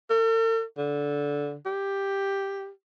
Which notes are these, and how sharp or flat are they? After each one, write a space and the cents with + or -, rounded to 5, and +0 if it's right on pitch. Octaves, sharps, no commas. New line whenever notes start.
A4 +45
D3 -15
G4 +5